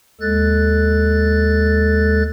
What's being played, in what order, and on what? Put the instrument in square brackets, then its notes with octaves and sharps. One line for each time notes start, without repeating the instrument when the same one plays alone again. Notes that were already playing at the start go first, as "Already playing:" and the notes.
[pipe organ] D#2 G#3 A4 F#6 A6